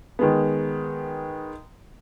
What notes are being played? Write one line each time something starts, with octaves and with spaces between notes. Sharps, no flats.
D#3 G#3 B3